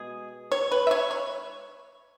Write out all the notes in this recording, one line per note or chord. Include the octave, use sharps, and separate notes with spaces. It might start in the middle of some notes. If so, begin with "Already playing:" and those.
Already playing: B2 G#3 G#4
C#5
B4
E5
C#5
C#5